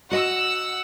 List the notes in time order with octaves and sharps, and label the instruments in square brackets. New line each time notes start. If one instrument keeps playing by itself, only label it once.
[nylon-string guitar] F#4 D#5 [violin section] F#5 E6